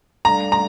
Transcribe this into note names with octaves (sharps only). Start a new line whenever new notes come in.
G3 D4 A4 D5 F5 A#5
A#5